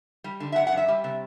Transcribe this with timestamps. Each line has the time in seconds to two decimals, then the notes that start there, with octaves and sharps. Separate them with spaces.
0.24 G3
0.40 D3
0.52 E5
0.56 F#2 F#5
0.67 F#5
0.72 F#2
0.77 E5
0.88 G3
1.04 C3